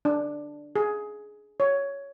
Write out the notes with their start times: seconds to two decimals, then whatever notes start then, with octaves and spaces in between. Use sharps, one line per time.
0.05 D4
0.76 G#4
1.60 C#5